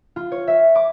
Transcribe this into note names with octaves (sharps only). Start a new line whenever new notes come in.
F4
C#5
E5
D6